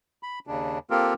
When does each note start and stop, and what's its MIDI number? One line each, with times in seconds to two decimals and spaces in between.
0.23 0.39 83
0.47 0.79 39
0.47 0.79 49
0.47 0.79 62
0.90 1.14 58
0.90 1.14 60
0.90 1.14 65
0.90 1.14 67
0.90 1.14 69
0.90 1.14 70